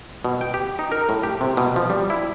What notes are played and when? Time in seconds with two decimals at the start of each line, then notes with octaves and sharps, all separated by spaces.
0.25 B2
0.41 G5
0.54 G4
0.79 D#4
0.92 A#4
1.09 A2
1.23 G4
1.41 C3
1.57 B2
1.76 F3
1.90 G3
2.10 E4